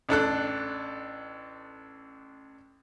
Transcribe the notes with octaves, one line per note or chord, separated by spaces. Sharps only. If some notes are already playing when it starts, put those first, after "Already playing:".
A1 D4 A4 F#6